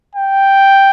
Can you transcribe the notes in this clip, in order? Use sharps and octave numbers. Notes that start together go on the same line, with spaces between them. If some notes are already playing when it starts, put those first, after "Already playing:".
G5